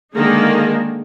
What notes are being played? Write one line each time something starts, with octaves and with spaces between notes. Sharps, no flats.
D3 D#3 G#3 A#3 D#4 G#4